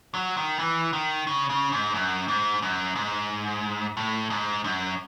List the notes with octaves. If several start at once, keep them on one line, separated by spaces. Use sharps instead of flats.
F#3
D#3
E3
D#3
C#3
C#3
G#2
F#2
G#2
F#2
G#2
A2
G#2
F#2